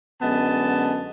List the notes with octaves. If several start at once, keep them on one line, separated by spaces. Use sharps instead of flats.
F#2 D3 G#3 B3 D#5 A5